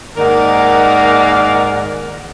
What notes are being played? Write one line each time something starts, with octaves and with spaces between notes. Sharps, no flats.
G#2 D#3 A#3 A#4 D5 F#5